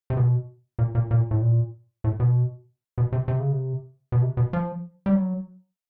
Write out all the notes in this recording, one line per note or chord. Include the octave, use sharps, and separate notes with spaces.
C3
B2
A#2
A#2
A#2
A2
A#2
A2
B2
B2
C3
C3
C#3
C3
B2
C3
B2
F3
G3
F#3